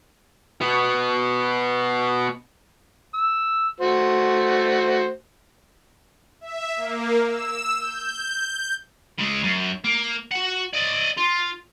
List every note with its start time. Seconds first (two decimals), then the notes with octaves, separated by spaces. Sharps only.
0.61 B2 B3
3.14 E6
3.80 A3 F#4 C5
6.41 E5
6.76 A#3
7.26 E6
7.79 G6
9.19 C#3 G#3
9.44 F#2
9.84 A#3
10.31 F#4 F#5
10.73 D5 D#5
11.18 F4